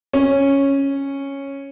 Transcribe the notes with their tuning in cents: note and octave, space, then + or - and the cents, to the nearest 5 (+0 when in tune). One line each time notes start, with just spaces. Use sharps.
C#4 -5